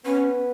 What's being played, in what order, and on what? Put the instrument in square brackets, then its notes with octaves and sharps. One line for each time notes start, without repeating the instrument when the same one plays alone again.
[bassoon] B3 [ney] C#4